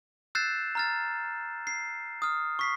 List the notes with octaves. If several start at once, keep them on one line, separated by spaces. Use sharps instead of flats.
E6 F#6 G6 A6 C7 E7
A#5 F6 A6
C7
D#6 F6
C#6 B6 C7